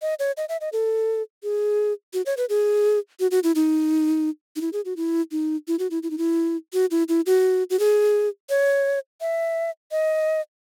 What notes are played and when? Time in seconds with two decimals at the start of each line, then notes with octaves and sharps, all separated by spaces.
0.02 D#5
0.19 C#5
0.37 D#5
0.49 E5
0.61 D#5
0.73 A4
1.43 G#4
2.14 F#4
2.26 C#5
2.37 B4
2.49 G#4
3.20 F#4
3.31 F#4
3.44 E4
3.55 D#4
4.56 D#4
4.61 E4
4.73 G#4
4.85 F#4
4.97 E4
5.31 D#4
5.68 E4
5.79 F#4
5.91 E4
6.03 E4
6.11 D#4
6.18 E4
6.73 F#4
6.91 E4
7.08 E4
7.26 F#4
7.70 F#4
7.79 G#4
8.50 C#5
9.21 E5
9.92 D#5